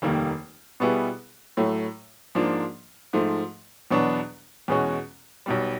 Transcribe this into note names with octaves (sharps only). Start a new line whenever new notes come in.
F1 D#2 D#3 G3 A#3
B2 G3 B3 E4 G#4
A2 F#3 A3
G#2 F3 A#3 D4
G#2 F3 A3
E2 B2 F#3 B3 D4
E2 B2 G#3 C#4 F#4
B1 B2 G3